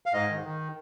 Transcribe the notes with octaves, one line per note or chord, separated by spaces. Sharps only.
F5
G#2 D#5
D#3
D#3